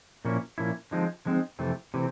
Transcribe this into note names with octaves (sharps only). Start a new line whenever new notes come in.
A#2 F3 A#3 C#4 E4
A#2 F3 A#3 C#4 E4
D3 F3 G#3 C4 D#4
D3 F3 G#3 C4 D#4
F2 C3 E3 A3 C4
C3 E3 A3 C4